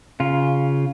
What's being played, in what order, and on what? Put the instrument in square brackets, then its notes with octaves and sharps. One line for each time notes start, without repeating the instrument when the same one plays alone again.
[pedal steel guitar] C#3 F4